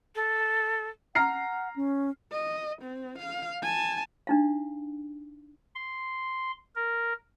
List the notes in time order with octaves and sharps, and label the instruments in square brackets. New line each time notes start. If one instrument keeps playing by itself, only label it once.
[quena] A4
[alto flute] F#5 [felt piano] A#5 F6 C7
[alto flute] C#4
[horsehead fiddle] D#5
C4
F5
G#5 A5
[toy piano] D4 D#4 F5
[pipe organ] C6
A#4